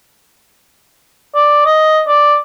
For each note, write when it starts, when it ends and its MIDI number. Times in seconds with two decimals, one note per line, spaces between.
1.35 1.62 74
1.66 2.02 75
2.08 2.37 74